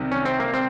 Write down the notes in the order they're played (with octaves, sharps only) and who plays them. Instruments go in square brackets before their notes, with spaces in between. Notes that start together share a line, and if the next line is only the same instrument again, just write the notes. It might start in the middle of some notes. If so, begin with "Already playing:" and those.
Already playing: [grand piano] C2 C3 D#3
[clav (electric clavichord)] C#4
C4
A#3
C4